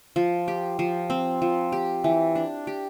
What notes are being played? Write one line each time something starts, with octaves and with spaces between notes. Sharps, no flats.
F3
G4
F3
C4
F3
G4
E3
D4
G4